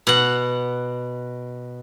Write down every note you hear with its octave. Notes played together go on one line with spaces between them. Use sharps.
B2 F#5